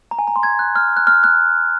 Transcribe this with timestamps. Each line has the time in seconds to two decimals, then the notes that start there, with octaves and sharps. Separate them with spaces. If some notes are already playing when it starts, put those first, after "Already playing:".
0.11 A#5
0.19 G#5
0.27 A#5
0.36 C6
0.43 G#6
0.59 F#6
0.76 F6
0.97 F#6
1.07 F6
1.24 F#6